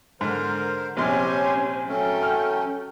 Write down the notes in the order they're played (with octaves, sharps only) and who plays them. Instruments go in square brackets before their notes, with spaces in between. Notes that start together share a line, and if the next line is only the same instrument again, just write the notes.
[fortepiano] G#2 [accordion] D3 A#4 C5
[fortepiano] A#1 C3 C6 [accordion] C#4 G4 C#5 [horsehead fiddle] C5 G#5
[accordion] F#3 A3 C#4 [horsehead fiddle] A4 G5
[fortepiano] F6